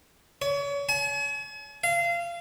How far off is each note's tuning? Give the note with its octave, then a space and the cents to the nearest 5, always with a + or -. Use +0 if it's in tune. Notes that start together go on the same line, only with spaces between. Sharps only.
C#5 +35
G#5 +45
F5 -25